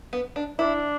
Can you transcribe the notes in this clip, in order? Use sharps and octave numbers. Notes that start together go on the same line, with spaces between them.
B3
D4
D4 E4